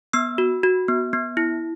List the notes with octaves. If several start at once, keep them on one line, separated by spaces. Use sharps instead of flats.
B3 E6
F#4
F#4
B3
B3
E4